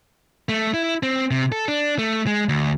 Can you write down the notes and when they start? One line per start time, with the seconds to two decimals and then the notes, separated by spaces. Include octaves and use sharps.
0.49 A3
0.74 E4
1.03 C4
1.31 C3
1.52 A4
1.68 D4
1.99 A3
2.27 G#3
2.49 D2